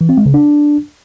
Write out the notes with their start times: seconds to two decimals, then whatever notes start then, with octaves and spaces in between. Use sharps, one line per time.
0.01 E3
0.09 C4
0.17 G#3
0.26 C#3
0.34 D4